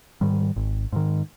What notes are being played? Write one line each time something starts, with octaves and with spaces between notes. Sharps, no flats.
G#2 D#3 G3
G#1
G#2 D#3